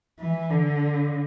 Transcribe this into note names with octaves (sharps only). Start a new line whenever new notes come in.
E3
D3